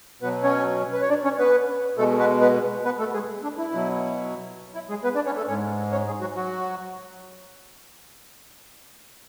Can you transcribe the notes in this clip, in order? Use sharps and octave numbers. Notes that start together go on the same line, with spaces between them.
B2 F#3 B3 B4
C#4 C#5
B4
C#5
D4 D5
C#4 C#5
B3 B4
B2 G#3 A3 A4
B3 B4
B3 B4
B3 B4
A3 A4
G#3 G#4
D4
E4
B2 F#3
E4
G#3 G#4
B3 B4
D4 D5
C#4 C#5
A3 A4
G#2 G#3 C#4 C#5
C#4 C#5
G#3 G#4
F#3 F#4
F#3 F#4